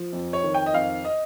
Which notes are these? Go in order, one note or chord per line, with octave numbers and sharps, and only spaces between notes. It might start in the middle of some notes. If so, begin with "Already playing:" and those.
Already playing: F3
F2
C#5
D#3
G5
D#5
F2 F5
D#5